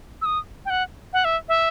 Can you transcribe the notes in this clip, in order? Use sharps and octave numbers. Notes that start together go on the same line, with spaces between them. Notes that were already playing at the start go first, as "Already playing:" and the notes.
E6
D#6
G5
F#5
F#5
E5
E5